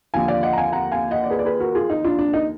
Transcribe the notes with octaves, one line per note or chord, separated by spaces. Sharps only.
D#2 D3 F3 F5 G#5
D5 F5
D#5 F#5
A#5
F5 G#5
F#5 A#5
F5 G#5
D#5 F#5
D5
G#4 B4
D5
G#4 B4
F#4 A#4
F4 G#4
D#4
D4 F4
D4
D#4